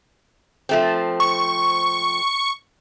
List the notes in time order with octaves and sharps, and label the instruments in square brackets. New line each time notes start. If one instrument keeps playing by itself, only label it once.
[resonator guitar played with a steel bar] F3 A3 C4
[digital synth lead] C#6